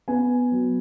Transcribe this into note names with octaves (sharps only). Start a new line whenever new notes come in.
B3 G#5
F#3